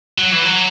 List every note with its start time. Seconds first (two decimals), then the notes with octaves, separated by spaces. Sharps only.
0.18 F#3
0.32 E3
0.44 F#3